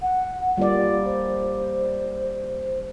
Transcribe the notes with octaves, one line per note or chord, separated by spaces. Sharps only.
F#5
G3 A#3 F4 D5
C5